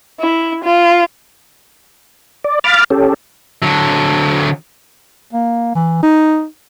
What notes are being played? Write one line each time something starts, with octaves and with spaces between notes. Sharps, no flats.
E4
F4
D5
F5 B5 D6 F6 A6
C#4 G4 A4
D3 F#3
A#3
E3
D#4